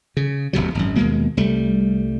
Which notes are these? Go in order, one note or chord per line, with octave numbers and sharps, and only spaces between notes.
C#3
D#1 C2 C3 F#3
G#1 F#2
D#2 B2 G#3 A#3
C2 G3 A3